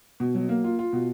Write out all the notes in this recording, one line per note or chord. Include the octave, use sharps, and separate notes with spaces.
B2
F#3
A#3
F4
F4
B2